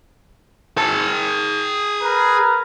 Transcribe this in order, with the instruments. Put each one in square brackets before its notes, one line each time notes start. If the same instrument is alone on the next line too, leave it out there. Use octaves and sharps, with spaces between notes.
[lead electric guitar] G#4 A5
[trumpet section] A#4 B4 A#5